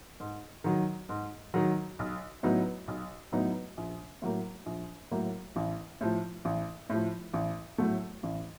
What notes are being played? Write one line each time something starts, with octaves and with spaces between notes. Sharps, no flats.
G#2
D#3 F#3
G#2
D#3 F#3
B1
A2 F#3 B3 D#4
B1
A2 F#3 B3 D#4
A#1
A2 F#3 A#3
A#1
A2 F#3 A#3
A1
A2 F3
A1
A2 F3
A1
A2 F#3 A3
A1